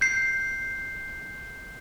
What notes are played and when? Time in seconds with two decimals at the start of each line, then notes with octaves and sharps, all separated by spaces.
0.01 G6 C7